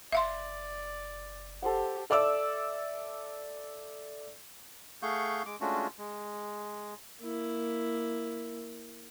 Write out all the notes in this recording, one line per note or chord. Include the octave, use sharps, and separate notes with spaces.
F#1 D5 E5 F5 C6
G4 A4 C5 F#5
A4 D5 E5 D6 E6
A3 G#4 F5 F#5 C#6 G6
G#3 D6
G#3 A3 C#4 D4 F4 F#4
G#3
A#3 E4